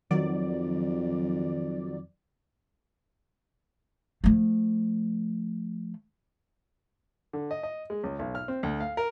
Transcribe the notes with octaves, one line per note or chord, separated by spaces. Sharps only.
F2 D#3 F#3 D5
F3 A3
D3
D#5
D#5
G#3
C#2
B1
F6
C4
D2
F5
A#4